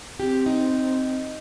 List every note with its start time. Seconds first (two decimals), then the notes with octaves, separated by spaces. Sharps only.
0.19 C4 G4
0.46 D#4